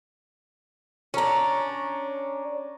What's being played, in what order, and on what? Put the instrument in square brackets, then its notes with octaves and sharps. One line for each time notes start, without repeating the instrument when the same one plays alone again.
[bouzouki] C#4 D4 [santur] C#5 A#5